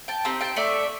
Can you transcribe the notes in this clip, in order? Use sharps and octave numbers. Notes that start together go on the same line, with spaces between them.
G5 A5
C4 D#4 G4
G5 A5
A3 D5 E5